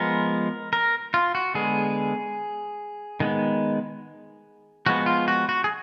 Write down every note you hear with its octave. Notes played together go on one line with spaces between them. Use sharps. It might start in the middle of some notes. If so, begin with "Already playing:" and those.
Already playing: F3 G#3 B3 A#4
A#4
F4
F#4
D3 G#3 B3 G#4
D#3 G#3 B3
F3 G#3 B3 F#4
F4
F#4
F#4
G#4